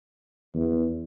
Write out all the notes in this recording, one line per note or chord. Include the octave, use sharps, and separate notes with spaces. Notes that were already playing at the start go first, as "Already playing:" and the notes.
E2